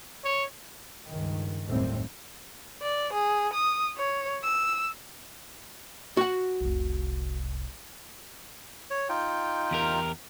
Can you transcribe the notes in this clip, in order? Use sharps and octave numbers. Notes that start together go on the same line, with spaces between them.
C#5
C#2 G2 D#3
F#1 D#2 A2 G3 C4
D5
G#4
D#6
C#5
E6
F#4 F#5
F1 C2
C#5
D#4 F4 G5
E2 G4 A#4